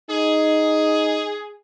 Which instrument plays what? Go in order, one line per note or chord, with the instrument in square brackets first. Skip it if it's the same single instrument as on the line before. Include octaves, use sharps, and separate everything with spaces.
[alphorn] D#4 [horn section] G#4